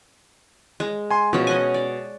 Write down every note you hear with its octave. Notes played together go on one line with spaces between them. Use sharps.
G#3
G#5 C6
B2 F3 C#4
D#5 F#5 G#5
D5